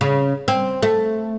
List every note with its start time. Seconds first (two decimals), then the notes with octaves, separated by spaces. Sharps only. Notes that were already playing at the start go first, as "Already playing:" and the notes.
0.01 C#3
0.48 C4
0.82 A3